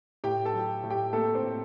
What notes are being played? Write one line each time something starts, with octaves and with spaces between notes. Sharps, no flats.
A2 G4 G5
A4 A5
F#3
A2
G4 G5
A3 A#3 A4
C4 C5
A2